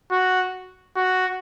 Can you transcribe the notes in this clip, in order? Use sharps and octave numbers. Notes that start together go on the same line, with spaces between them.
F#4
F#4